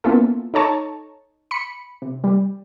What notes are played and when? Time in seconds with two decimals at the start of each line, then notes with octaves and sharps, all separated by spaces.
0.04 A#3 B3 C#4 E4 F4 A4
0.54 D#4 A4 C#5 A5 A#5 C#6
1.51 B5 C#7
2.02 C3
2.24 G3